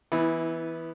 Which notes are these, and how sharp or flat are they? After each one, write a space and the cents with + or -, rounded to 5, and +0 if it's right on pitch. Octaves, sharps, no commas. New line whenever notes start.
E3 +0 B3 +0 E4 -25